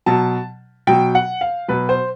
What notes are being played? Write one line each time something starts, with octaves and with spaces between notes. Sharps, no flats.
B2 F#3 A5
B2 F#3 G5
F#5
F5
B2 F#3 B4
C5